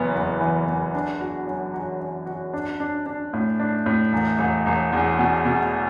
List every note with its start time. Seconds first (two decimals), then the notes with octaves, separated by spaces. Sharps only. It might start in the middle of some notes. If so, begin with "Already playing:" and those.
Already playing: F#1 E3 B3
0.15 E2
0.41 E3
0.68 E2
0.94 D4
1.21 F#4
1.47 F#2
1.74 F#4
2.01 F#2
2.26 F#4
2.53 D4
2.80 D4
3.06 D4
3.33 A2
3.60 D4
3.86 A2
4.13 E1
4.39 E1
4.66 E1
4.93 E2
5.19 B2
5.45 B2